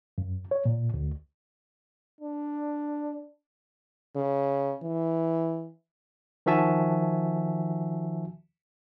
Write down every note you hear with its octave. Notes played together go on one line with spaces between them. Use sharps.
F#2
C#5
A#2
D2
D4
C#3
E3
D#3 F3 F#4 E5 G#5 A5